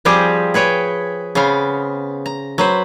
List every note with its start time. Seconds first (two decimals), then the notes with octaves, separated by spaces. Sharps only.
0.05 F3 G3 C4 G4 G#4
0.54 G#4 B4 C#5 G5
1.35 C#3 B3 C4 F5
2.26 A#5
2.58 F#3 B4 C5